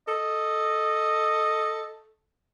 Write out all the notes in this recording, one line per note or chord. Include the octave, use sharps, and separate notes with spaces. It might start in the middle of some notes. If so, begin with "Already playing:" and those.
A4 D#5